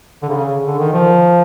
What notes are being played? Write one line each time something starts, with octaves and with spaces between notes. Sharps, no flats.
D3
C#3
D3
D#3
F3